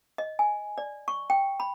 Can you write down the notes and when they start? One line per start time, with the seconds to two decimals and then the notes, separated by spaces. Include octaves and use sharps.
0.18 D#5
0.39 G#5
0.78 D5
1.08 C#6
1.30 G5
1.60 B5